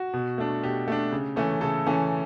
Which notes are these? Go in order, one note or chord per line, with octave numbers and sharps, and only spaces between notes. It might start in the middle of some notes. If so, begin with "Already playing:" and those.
Already playing: F#4
B2
A3 D4
B2 G4
A3 D4
C#3
E3 A3 C#4
C#3 A4
E3 A3 C#4